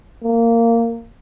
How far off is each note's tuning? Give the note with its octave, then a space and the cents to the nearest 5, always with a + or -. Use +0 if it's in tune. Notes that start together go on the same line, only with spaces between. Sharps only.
A#3 -15